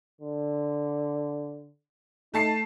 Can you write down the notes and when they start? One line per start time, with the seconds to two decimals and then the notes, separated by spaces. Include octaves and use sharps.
0.21 D3
2.34 A3 D#4 A5 C7